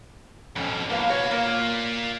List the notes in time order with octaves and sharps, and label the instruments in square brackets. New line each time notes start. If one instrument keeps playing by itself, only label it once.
[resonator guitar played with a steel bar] F2 C#4 [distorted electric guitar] G#2 B2
[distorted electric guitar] A2 F#3 [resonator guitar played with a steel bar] A#3 B3 F5
[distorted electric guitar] F#4 B4 [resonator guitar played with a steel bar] C#5
[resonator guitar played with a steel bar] A#3 [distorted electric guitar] F4 D5